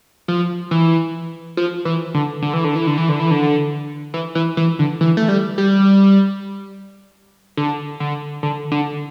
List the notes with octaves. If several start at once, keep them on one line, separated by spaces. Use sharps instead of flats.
F3
E3
F3
E3
D3
D3
E3
D3
E3
D3
E3
D3
E3
D3
E3
E3
E3
D3
E3
A3
G3
G3
D3
D3
D3
D3